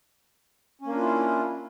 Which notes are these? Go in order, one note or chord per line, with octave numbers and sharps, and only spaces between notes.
A#3 C#4 D4 E4 F4